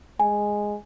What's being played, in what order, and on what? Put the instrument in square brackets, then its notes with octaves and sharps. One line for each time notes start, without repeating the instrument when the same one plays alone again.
[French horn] G#3 [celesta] G#5